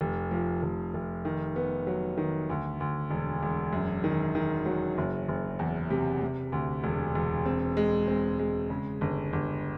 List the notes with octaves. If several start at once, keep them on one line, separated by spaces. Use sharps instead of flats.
F1
F3
F1
F1
D#3
B3
F#3
D#3
D2
D2
E1
E1
F#2
D#3
D#3
F#3
F#1
F#1
E2
C3
C3
D2
E1
E1
C4
G#3
C4
G#3
C#3
G1
G1